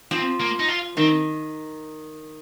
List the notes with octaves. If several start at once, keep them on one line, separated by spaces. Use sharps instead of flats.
F3 C4
A#3
D#4
F4
D#3 C4